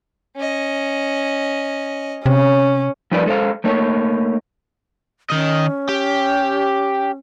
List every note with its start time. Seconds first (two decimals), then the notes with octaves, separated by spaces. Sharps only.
0.36 C#4 D#5
2.26 C3 C#4
3.12 F3 G3 D#4 A#4 B4 D5
3.26 G#3 A4 C5 F5
3.64 A3 A#3 D#4 C#5
5.30 D#3 C#4 D#5
5.88 G4